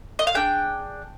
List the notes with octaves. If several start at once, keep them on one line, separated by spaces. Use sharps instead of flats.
D#5
F5
D4 G#4 G5